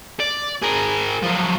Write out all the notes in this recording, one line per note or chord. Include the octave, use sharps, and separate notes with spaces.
D5
G#4 A#4
F3 F#3